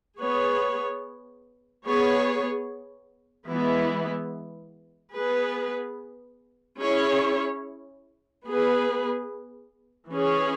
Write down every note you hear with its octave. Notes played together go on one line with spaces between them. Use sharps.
B3 G#4 C#5
B3 G#4 C#5
E3 G#3 B3 E4
B3 G#4 B4
C#4 E4 G#4 C#5
B3 G#4 B4
E3 C#4 G#4 C#5